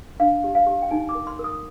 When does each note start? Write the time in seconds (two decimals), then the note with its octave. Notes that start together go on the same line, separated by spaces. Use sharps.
0.20 D4 F5
0.44 G4
0.55 F5
0.67 G4
0.82 G5
0.91 D#4 G#5
1.09 D6
1.15 A#4
1.27 C6
1.39 A#4
1.44 D#6